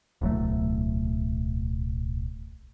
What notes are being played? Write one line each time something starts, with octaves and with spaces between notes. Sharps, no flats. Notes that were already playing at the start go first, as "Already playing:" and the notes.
D1 B1 F#3 A3